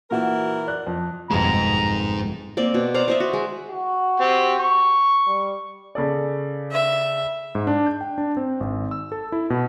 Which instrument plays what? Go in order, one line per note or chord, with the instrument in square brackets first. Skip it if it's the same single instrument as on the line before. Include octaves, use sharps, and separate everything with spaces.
[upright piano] A#2 F#4 [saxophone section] E3 E4 A#4
[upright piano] D5 F#6
F2
[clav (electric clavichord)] G1 F2 B2 [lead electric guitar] G#2 G#3 [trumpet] A#5
[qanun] A#3 C4 D5
B2
C5 D5 F5 A#5
C5 D#5 E5
F#4
G#3
[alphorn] F#4
[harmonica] C4 G4
C#6
[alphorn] G3
[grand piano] C#3 A4 D5
[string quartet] E5
[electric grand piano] G#2
D4
G6
G5
D4
C4
G#1
E6
A4
E4
B2